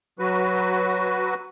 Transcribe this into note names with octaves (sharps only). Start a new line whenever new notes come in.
F#3 F#4 B4